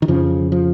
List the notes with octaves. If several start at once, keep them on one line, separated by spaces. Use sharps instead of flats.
D#3
F2 C#3 F3
F3